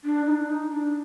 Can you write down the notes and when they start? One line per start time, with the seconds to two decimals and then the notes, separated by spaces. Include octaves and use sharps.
0.05 D4
0.26 D#4
0.31 D4
0.49 D#4
0.71 D4